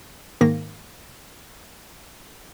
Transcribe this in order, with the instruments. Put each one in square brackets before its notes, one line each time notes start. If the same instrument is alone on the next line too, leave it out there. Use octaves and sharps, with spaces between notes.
[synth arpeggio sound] G#2 D#3 A#3 A#6